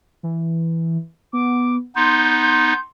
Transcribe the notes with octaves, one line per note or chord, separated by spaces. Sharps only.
E3
B3 D6
B3 D#4 C6 G6